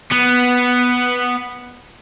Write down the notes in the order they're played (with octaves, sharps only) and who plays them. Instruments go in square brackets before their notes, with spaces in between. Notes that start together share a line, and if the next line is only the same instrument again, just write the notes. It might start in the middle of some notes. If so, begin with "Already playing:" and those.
[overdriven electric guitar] B3